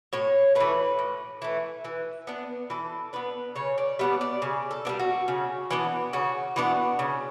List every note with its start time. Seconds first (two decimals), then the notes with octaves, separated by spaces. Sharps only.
0.13 A2 C#5
0.55 E3 A3 B4
0.99 A2
1.42 E3 A3
1.85 E3
2.27 B3 D4
2.70 E3 A4
3.13 B3 D4 B4
3.56 C#3 C#5
3.78 D5
3.99 G3 B3 D4 E5
4.21 D5
4.42 C#3
4.71 A4
4.85 G3 B3 D4
4.99 F#4
5.28 C#3
5.71 E3 B3 D4
6.13 C#3 F#4
6.56 E3 B3 D4
6.99 C#3